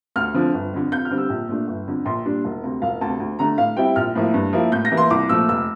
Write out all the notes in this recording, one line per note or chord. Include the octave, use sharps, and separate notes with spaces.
D2 F6
D3 F3 C4
G1
F2 D3
F2 G6
F6
D3 G3 C4
E6
A#1
A#2 A3 D4
G1
F2 D3
A#1 C6
A#2 G3 D4
E1
D2 C3
E1 F5
D2 C3 A5
D2
D3 A3 A#5
A2 F5
G3 C4 E4 G5
A#1 F6
A2 F3 A#3 E4
G2
F3 A#3 E4
A2 G6
A#6
E3 A#3 E4
C6
C2 D6
A#2 F3 A3 E6
F1 E6